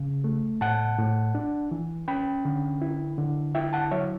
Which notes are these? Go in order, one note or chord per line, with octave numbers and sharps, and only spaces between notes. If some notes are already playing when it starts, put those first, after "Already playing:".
Already playing: C#3
A3
A2 F#5 A5
A2
D4
E3
C#4 G5 B5
D3
E4
D3
E4 E5 G5
F#5 A5
F#3 C#5 E5